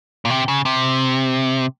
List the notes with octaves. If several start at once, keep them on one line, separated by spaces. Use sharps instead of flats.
A#2
C3
C#3
C3